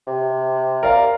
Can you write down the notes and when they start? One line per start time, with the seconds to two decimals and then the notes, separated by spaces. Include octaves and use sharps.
0.07 C3
0.83 A#4 D5 F5